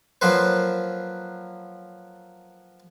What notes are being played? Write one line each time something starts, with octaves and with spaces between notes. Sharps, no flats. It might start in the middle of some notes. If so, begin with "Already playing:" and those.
F3 F#3 A#3 B4 C5